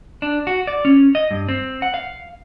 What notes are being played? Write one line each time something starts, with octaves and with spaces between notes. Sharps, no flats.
D4
F#4
D5
C#4
D#5
G2
C4
F#5
F5